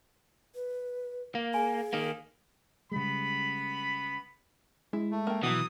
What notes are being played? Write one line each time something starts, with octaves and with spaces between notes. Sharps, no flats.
B4
A#3
G#4 G#5
D#3 A#3
C#3 G3 G#3 B3 B5
G#3 E4
A3
A#3 G5
B2 E3 F#3 F#4 D#6